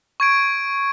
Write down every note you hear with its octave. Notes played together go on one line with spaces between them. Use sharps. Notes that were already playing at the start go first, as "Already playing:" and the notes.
C#6 G#6 D7